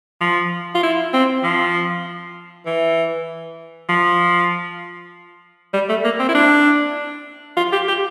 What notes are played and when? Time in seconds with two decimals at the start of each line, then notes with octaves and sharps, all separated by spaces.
0.21 F3
0.75 F4
0.83 E4
1.13 C4
1.44 F3
2.66 E3
3.89 F3
5.73 G3
5.89 A3
6.04 A#3
6.19 C4
6.29 E4
6.35 D4
7.57 F4
7.72 G4
7.88 G4